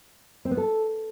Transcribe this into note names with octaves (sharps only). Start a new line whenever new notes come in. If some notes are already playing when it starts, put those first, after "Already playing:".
C4
B3
A4